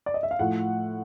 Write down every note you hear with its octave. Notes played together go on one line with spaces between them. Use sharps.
D5
D#5
E5
F5
A2 F3 F#5